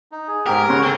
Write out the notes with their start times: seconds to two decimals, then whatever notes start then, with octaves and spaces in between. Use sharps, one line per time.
0.12 D#4
0.28 G#4
0.46 G#2 G4 A#4
0.69 C#3 C#5 F#5 C6
0.82 D3 C4